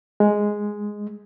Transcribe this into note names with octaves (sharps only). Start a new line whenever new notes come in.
G#3